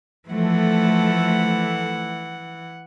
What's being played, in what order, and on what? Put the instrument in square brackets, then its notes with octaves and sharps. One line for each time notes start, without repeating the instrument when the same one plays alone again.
[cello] E3 F#5 [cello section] F3 A3 A4